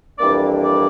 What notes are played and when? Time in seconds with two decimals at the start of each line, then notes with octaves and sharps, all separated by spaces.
0.19 F2 E3 G3 A#3 D4 D5
0.64 D5